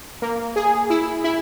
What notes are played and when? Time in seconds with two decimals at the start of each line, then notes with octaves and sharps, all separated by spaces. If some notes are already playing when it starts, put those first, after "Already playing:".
0.22 A#3
0.56 G#4
0.90 E4
1.24 E4